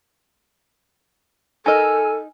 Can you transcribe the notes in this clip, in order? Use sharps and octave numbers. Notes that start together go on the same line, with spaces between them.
D#4 A4 A#4 D#5 G#5 E6 F6